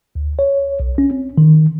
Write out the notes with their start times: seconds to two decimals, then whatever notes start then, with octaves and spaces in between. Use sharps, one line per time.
0.15 D2
0.39 C#5
0.80 B1
0.98 C#4
1.11 C4
1.38 D#3